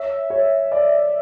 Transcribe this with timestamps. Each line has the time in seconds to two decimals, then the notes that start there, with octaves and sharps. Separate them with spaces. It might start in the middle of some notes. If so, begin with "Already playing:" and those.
Already playing: C#5 E5
0.30 C#5
0.72 D5